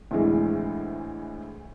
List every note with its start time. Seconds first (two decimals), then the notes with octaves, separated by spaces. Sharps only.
0.11 D2 A2 E3 G#3